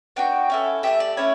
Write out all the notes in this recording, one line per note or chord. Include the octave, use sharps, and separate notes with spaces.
B3 D4 F#4 G5
C#4 E4 A4
A3 C#4 G4 E5
D5
A3 C#4 E4 C#5